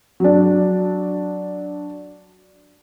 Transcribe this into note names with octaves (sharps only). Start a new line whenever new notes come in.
F#3 D4